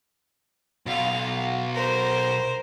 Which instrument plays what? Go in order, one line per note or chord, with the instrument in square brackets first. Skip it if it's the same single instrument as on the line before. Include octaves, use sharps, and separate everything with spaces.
[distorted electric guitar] B1 [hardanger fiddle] F5
[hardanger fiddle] A#4 C5